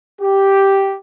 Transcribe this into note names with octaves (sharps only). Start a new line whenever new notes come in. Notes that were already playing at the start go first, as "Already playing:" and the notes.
G4